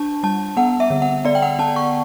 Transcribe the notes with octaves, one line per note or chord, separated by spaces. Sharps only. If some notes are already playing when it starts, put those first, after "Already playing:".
Already playing: D4 A5
G3 A5
B3 F#5
E5
D3
F#5
B3 D5
G5
F#5
B3 A5
C#6